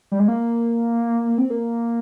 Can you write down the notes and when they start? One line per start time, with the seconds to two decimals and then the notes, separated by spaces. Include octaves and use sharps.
0.12 G3
0.19 G#3
0.28 A#3
1.38 C4
1.50 A#3